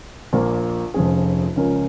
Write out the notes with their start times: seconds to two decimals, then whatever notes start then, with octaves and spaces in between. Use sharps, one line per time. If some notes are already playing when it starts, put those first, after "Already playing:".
0.33 A#1 A#2 A#3
0.94 F1 F2 F3 C#4 G#4
1.56 C#2 C#3 F3 C#4 A#4